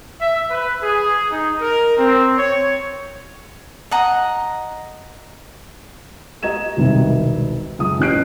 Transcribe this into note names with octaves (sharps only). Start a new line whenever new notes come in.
E5
B4
G#4
D#4
A#4
C4
C#5
D#5 F#5 A#5
G4 D#5 A#5 G#6 E7
E1 C2 D#3 E5
C#2 F#2 D#6
A1 C#4 G4 F#6 C7 D7